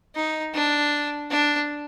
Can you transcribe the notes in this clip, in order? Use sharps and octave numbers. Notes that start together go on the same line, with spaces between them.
D#4
D4
D4